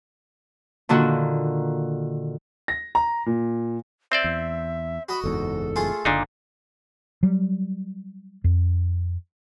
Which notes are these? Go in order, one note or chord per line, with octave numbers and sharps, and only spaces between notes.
A#2 D3 D#3 F#4
A#6
A#5
A#2
C4 C5 D5 E5
E2
F#4 D#5 B5
F#1 E2 G#2 A4
A3 F4 G#4
F#1 A#2 D3 D4 D#4
F#3 G3
F2